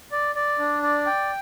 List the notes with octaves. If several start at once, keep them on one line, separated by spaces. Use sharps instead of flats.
D5
D5
D4
D5
G5